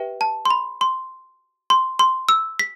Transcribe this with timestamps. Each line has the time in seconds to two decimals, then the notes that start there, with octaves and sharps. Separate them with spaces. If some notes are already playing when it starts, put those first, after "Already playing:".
Already playing: G4 B4 E5 G5
0.21 A5
0.45 C6
0.50 B5
0.81 C6
1.70 C6
1.99 C6
2.29 E6
2.59 B6